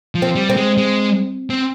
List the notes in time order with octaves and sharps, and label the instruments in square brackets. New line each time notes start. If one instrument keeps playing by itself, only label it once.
[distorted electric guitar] F3
[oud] C4
[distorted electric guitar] G3
[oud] C4
[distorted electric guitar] G#3
G#3
C4